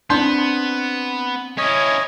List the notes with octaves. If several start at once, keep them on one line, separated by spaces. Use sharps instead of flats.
B3 C4 D4 A5 C6 G6
C#4 E4 C#5 D#5